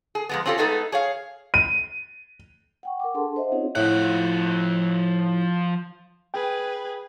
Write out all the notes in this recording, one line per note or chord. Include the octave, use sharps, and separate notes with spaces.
G#4
F2 G#3 B3
C4 C#4 F4 G4 A4
G#3 A3 B3 D#4 G#4 A4
G#4 C#5 F5
D#7
F#5 G5 C#6
A#4 F#5 D6
D4 G#4 A4 A5 C6
C5 D#5 E5 F#5
C4 C#4 D#4 F4 G#4 C#5
A2 F3 F#5
G#4 B4 G5